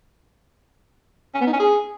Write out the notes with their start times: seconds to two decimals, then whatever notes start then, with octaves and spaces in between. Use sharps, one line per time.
1.35 C#4
1.41 B3
1.47 D#4
1.53 C#4
1.60 G#4